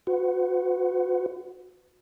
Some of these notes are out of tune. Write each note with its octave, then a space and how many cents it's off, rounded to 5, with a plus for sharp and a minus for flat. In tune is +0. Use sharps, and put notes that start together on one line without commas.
F#4 -30 B4 +40 F#5 +0